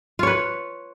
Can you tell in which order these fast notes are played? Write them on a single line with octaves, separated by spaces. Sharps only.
F4 C#5 B4